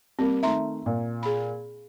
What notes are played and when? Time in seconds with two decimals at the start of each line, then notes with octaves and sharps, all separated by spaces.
0.19 G3 A#3 C4
0.43 D#3 A3 E5 A#5 C6
0.86 A#2
1.23 G#4 B5